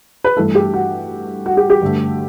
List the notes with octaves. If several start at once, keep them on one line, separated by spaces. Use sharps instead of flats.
B4
G2 E3 A3 A4
G4
F#4
F#4
G4
G4
G2 D3 A3